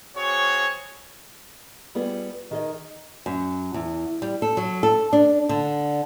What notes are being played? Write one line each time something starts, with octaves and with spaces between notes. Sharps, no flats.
C4 F#4 G#4 C#5
G3 B3 F4 G#4
D#3 G#4 D#5
F#2
E2
G3
A4
F#3
A4
D4
D3